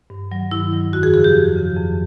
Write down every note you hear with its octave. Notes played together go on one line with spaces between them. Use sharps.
G2
D#3 F#3
G2 E4
D#3 F#3
F2 F#4
G#4
C#3 F3 G#4
G4
F2
C#3 F3
F2